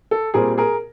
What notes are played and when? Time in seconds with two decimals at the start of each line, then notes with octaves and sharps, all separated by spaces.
0.11 A4
0.34 A#2 G3 C4 G#4 A#4
0.58 G#4 A#4